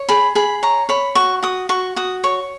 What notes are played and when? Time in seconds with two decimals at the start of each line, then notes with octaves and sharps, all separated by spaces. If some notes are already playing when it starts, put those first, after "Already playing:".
Already playing: C#5
0.09 G#4 B5
0.35 G#4 B5
0.63 C#5 A#5
0.89 C#5 B5
1.15 F#4 C#6
1.43 F#4 D#6
1.69 F#4 C#6
1.96 F#4 D#6
2.24 C#5 C#6